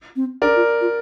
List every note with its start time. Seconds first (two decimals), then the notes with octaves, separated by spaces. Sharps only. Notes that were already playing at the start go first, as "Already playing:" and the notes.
0.16 C4
0.42 D4 A#4 D5
0.56 F4
0.81 F4